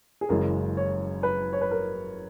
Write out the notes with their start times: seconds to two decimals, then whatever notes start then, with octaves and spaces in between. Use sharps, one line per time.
0.21 G#4
0.29 F#1 F#2 C#3 E3 G#3 A#4
0.77 C#5
1.23 B4
1.53 C#5
1.61 B4
1.71 A#4